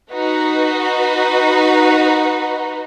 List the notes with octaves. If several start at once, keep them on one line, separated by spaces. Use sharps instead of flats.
D#4 F#4 B4